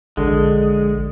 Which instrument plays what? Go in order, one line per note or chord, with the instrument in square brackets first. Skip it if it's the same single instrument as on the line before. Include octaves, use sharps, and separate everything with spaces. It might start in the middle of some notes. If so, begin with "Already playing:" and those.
[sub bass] A#1 [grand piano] D3 [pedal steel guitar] G#3